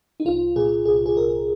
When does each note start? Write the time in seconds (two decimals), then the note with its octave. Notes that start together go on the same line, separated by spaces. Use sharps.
0.20 D#4
0.25 C2 F4
0.56 A#2 G#4
0.85 C2 G#4
1.06 G#4
1.17 C2 A#4